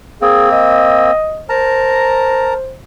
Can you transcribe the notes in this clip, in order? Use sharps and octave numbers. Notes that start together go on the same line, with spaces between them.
A#3 C4 G#4
D#5
A#4 C5 A5 A#5